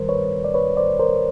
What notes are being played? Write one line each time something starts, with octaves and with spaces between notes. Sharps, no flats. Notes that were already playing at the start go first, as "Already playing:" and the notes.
Already playing: G2 D#3 G3 A#4 C5
B4 C#5
D5
B4 C#5
C5 D5
A#4 C5